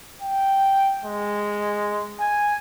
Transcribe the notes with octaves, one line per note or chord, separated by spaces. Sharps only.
G5
G#3
G#5